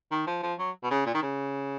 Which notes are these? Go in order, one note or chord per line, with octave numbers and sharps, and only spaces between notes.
D#3
F3
F3
F#3
B2
C#3
A#2
D#3
C#3